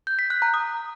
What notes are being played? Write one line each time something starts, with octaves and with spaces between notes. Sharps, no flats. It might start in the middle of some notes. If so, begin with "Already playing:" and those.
G6
B6
F#6
A#5
D#6